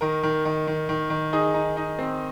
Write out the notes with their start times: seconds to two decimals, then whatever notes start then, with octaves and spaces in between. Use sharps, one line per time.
0.01 D#3 A#4
0.23 D#3
0.45 D#3
0.67 D#3
0.89 D#3
1.10 D#3
1.33 D#4 G#4
1.54 D#4
1.77 D#4
1.99 C4